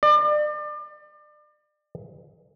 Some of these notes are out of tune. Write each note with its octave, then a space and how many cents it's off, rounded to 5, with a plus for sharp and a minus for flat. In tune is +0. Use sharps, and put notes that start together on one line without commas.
D5 +35